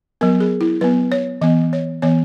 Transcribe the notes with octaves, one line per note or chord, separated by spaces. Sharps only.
F#3 B3 A#4
G#4
E4
F#3 B3 B4
C#5
E3 B3 D#5
C#5
E3 B3 C#5